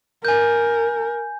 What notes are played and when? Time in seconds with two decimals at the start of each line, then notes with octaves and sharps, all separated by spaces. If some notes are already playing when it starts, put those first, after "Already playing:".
0.25 A#4 G#5 G6